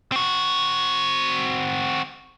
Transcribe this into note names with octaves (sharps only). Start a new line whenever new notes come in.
C4 F#4